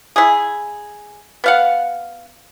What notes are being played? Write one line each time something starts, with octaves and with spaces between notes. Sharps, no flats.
E4 G#4
B3 F5 F#5